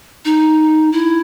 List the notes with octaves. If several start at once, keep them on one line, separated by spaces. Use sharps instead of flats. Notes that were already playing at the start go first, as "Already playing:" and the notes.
D#4
E4